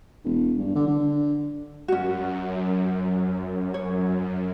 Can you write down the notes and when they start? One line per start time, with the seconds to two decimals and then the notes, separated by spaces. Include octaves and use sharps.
0.24 E1
0.59 G2
0.75 D3
0.87 D3
1.88 F#2 C#4 F#4
3.74 C#5